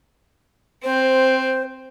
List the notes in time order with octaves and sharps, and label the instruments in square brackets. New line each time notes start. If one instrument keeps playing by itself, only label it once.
[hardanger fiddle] C4 [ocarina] C5